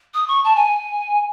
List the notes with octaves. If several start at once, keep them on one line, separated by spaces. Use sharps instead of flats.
D#6
C#6
A5
G#5